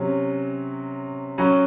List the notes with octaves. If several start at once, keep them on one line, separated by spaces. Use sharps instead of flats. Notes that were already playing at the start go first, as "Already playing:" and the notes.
Already playing: C3 F#3 C#4
F#3 C#4 F#4